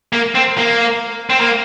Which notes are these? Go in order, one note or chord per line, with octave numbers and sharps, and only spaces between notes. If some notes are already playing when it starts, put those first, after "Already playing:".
A#3
C4
A#3
C4
A#3